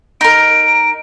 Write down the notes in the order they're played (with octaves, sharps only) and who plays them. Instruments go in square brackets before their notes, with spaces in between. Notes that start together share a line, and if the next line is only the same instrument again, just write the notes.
[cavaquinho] D#4 A#4 [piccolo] D7